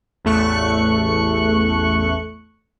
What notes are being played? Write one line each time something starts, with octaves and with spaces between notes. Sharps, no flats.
A1 E2 A3 C#6 F#6 C#7